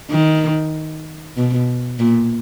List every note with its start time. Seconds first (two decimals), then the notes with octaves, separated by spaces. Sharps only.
0.11 D#3
1.36 B2
1.99 A#2